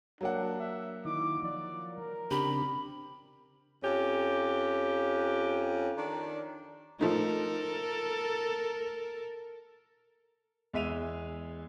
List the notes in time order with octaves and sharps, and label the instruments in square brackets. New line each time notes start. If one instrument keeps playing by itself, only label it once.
[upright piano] F#3 A#3 F#5 [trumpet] D4
[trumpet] E5
[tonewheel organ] D#3 D#4 E4 [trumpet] D6
[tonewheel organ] F3 [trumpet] D5
[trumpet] A#4
[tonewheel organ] C#3 C4 D4 [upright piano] G4 [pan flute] B5
[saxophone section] F2 C#4 G4
D#3 D4 D5
[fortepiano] F3 A3 D#4 [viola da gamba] A4 A#4
[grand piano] E2 G#3 E5 D#7 F7